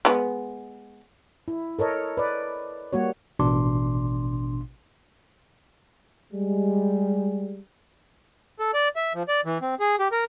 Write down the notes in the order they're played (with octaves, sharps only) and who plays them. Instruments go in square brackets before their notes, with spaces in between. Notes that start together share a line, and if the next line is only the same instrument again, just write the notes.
[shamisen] G#3 B3
[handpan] E4
A4 A#4 C#5 D#5
B4 D5
G3 A#3 F#4 C#5
[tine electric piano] A1 B2 D4 C6 D6
[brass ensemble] G3 G#3
[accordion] A4
D5
E5
F3
D5
E3
C4
G#4
G4
A#4